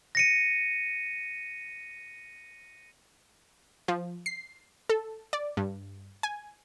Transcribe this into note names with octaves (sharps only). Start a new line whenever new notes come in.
A#6 C#7 D#7
F3
C7
A4
D5
G2
G#5